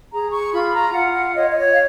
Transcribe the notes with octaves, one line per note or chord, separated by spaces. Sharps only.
G#4 A#5
C#6
F4 B5
A#5
F4 F#5
F#5
C#5 D#5
D#5
C#5
F5